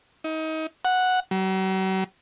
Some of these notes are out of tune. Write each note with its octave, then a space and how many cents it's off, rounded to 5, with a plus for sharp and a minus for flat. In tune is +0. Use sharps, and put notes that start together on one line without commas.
D#4 +30
F#5 -5
F#3 +45